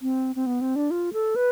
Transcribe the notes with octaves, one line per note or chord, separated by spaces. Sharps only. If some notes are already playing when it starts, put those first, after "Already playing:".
C4
C4
B3
C4
D4
F4
A4
B4